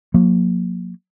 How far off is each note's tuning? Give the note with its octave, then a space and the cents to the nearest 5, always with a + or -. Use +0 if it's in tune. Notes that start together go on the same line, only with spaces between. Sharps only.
F#3 -45 A#3 +0